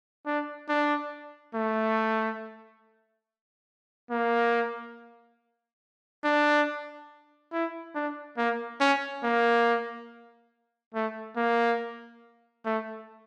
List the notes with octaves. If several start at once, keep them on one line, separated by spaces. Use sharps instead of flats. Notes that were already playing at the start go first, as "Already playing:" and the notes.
D4
D4
A3
A#3
D4
E4
D4
A#3
C#4
A#3
A3
A#3
A3